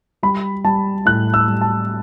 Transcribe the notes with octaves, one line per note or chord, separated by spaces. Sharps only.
G3 B5
G3 A5
A2 F#6
E6
G3
A5